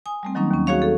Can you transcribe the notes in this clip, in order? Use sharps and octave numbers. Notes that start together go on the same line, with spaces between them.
G#5 D#6
G3 A3 C4
D#3 F#3 G3 A#3 C#4 D#4
D#2 C#4
F#4 G#4 C#5 F5 C#6
A4